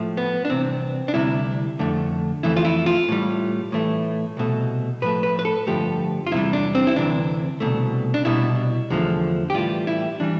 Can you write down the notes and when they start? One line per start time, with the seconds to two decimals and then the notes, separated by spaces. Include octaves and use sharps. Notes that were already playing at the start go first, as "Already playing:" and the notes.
Already playing: A2 F3 A3
0.17 B3
0.45 D4
0.49 C2 C3 E3 C4
1.08 D4
1.14 D2 C3 G3 E4
1.79 F2 D3 A3
2.43 F2 E3 A3 E4
2.56 F4
2.65 E4
2.86 F4
3.09 A2 G3
3.72 A2 E3 A3
4.37 C2 B2 A3
5.02 A2 F3 A3 B4
5.23 B4
5.39 B4
5.45 A4
5.67 G2 D3 F3 A3 G4
6.27 F4
6.32 E2 C3 G3 E4
6.53 D4
6.75 C4
6.87 E4
6.96 D2 C3 E3 D4
7.60 C2 B2 A3
8.14 D4
8.25 C2 B2 G3 E4
8.90 E2 D3 F3 A3
9.50 G4
9.54 A2 E3 G3 F4
9.87 E4
10.20 E3 G3 D4